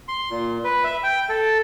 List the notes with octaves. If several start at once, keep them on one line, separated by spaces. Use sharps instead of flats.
C6
A#2
B4
E5
G5
A4